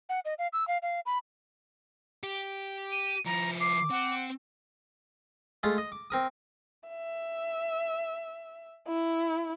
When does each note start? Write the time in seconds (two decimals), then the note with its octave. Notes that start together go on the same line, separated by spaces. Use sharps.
0.09 F#5
0.25 D#5
0.39 F5
0.53 E6
0.68 F5
0.82 F5
1.06 B5
2.24 G4
2.92 D#7
3.26 F3 E4 A#5
3.61 D6 C7
3.91 C4 F#5
5.63 G#3 A3 F4 F5
5.78 D#5
5.92 D6
6.10 C4 A#4 D#6
6.89 E5
8.88 E4